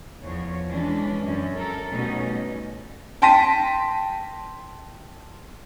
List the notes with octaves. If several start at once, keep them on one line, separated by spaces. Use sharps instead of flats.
E2 F3 C#5
E3 G#3 C#4 D4
F#2 C#4
A4 A#4
B2 G3 A3 C#4 D#4
G5 A5 C6 A#6 B6 D#7